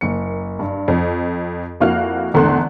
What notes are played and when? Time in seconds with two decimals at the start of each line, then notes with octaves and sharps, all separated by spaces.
0.01 F#1 A#3 C#7
0.59 G2
0.88 F2
1.80 F2 A#3 E4 F#4 F5 F6
2.34 G#1 E2 D3 A3 C6 F#6